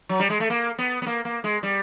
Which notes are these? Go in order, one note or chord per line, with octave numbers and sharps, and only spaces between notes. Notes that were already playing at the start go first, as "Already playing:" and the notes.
F#3
G3
G#3
A3
A#3
B3
B3
A#3
A#3
G#3
G3